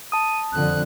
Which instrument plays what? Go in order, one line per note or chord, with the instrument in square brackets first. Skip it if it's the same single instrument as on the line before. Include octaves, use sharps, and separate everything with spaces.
[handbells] A5 D#6 [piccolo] D#7
[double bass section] F2 D3 [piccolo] F#6